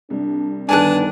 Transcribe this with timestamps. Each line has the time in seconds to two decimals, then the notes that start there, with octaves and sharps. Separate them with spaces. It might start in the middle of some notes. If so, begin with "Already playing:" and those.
0.10 C2 D4
0.69 G1 D#3 B3 D4 G#5 A5 F#6